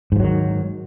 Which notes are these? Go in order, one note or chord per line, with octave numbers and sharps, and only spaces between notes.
G#2 D#3 F3 F#3